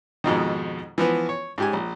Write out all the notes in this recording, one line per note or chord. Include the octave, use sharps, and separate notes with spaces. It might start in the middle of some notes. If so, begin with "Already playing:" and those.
F2 G#2 B2 D#3
E3 F3 B3
C#5
G#2 G4 G#5
A#1